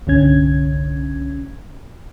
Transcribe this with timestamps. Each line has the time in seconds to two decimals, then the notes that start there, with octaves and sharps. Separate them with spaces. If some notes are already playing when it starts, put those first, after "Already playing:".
0.07 G1 C2 D3 C#4 G#6